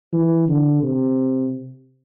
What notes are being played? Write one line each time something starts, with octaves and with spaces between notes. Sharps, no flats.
E3
D3
C3